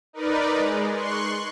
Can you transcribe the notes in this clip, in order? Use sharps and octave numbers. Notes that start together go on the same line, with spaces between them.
D#4 A#4 B4 D5
G#3
C6 C#6 F#6